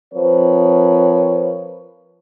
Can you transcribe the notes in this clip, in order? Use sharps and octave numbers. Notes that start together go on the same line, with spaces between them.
F3 C4 A#4 B4 C#5